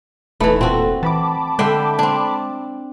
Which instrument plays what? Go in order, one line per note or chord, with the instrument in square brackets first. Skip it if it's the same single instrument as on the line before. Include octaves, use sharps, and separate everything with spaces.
[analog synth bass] E1 [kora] E3 A3 [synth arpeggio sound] B3 D#4 B5
[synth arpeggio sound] A#2 A4 [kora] C4 F#4
[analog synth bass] E3 [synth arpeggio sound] A5 B5 D6
[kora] D3 E5 G5 [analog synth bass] G#3
[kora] C4 D4